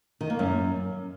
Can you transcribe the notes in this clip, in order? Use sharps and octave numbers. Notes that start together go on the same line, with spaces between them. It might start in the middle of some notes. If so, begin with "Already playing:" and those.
D#3
A#3
F#2